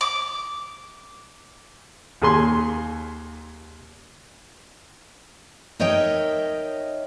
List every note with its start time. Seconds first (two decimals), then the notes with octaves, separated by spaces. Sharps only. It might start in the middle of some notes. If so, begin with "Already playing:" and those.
0.01 D6
2.22 D#2 G#4 G#5 C6
5.80 D#4 A#4 C#5 D#5 E5 G5